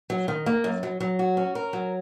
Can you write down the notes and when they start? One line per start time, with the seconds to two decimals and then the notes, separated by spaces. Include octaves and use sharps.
0.10 F#3
0.28 D#3
0.46 A#3
0.64 F#2
0.83 F#3
1.00 F#3
1.19 F#4
1.37 C#4
1.55 A#4
1.73 F#3